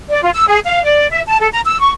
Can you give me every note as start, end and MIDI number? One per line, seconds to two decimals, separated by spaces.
0.10 0.21 74
0.22 0.30 65
0.35 0.45 88
0.48 0.59 68
0.65 0.83 77
0.84 1.08 74
1.10 1.21 76
1.27 1.37 81
1.40 1.48 69
1.52 1.60 82
1.66 1.80 88
1.80 1.91 85